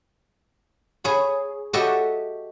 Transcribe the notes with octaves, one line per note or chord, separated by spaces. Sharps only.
G#4 C#5 B5
F#4 G4 A4 D#5 E5